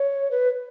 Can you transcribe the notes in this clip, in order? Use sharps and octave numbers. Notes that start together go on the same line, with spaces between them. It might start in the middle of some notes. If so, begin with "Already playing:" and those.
Already playing: C#5
B4